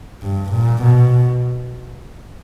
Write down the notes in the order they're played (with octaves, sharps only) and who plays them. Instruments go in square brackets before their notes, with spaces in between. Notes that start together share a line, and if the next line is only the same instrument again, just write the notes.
[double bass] G2
A#2
B2